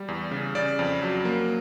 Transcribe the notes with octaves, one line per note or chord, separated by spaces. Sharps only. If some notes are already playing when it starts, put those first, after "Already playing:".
Already playing: G3
E2
C#3
C#3 D5
F2
F#3
A#3